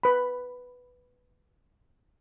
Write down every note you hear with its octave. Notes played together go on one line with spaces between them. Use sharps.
B4 B5